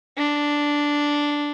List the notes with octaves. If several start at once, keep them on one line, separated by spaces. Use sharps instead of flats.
D4